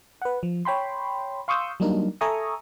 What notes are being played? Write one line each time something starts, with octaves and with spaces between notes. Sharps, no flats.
B4 F#5
F3
C#5 G5 B5 C6
F5 C6 C#6 D#6 E6 G6
F#3 G3 A#3 D4 D#4 A#4
A4 E5 G#5 A#5 C#6 D#6